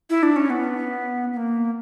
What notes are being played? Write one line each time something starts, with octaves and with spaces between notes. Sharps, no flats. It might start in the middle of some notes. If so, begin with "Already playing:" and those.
E4
D4
C#4
B3
B3
A#3